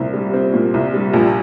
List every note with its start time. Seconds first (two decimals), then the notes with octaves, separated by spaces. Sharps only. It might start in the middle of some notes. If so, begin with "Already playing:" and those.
Already playing: C2 A#2 C4
0.14 G3
0.34 C4
0.54 A#2
0.74 C2
0.94 G3
1.13 A#1